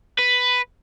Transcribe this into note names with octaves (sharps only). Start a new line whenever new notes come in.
B4